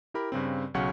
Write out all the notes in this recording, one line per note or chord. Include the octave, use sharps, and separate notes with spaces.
E4 G4 A#4 B5
G2 C#3 C4
B1 C#3 F#3 C#4 F#5 C#6